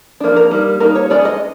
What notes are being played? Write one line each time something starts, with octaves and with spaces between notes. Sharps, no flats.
F3 A#3 D4
A#4
G3 A#3 D#4
G3 A#3 D#4 A#4
C#5
G#3 C#4 D5
D#5